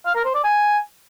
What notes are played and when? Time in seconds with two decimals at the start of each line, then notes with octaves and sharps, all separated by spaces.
0.06 F5
0.15 A#4
0.25 C5
0.34 D5
0.44 G#5